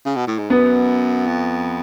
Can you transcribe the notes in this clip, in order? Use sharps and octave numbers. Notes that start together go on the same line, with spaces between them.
C#3
B2
A2
G#2
F#2 B3
F2